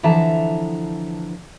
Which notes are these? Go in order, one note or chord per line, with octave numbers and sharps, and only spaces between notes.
D3 E3 F3 E5 A5 A#5